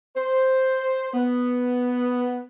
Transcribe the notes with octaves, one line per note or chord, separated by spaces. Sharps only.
C5
B3